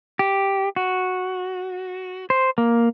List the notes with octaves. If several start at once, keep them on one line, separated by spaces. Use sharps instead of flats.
G4
F#4
C5
A#3